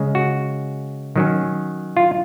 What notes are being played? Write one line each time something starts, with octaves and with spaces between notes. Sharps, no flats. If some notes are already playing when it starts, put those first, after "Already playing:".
Already playing: C#3 G#3
F#4
D#3 F#3 C#4
F4